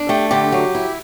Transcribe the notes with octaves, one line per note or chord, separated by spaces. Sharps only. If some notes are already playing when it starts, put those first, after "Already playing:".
Already playing: D4
A3 G4
D3 G4
F#3
E4